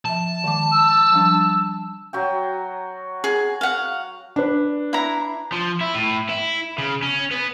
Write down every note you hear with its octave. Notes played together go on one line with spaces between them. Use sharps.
F3 E5 A5
D#3 G#3 D6
E6
F3 G3 D4
F#3 F#4 G5
G#4
F5 F#5
D4 B4
E4 A#5
F3
E4
A2
E4
C#3
C#4
B3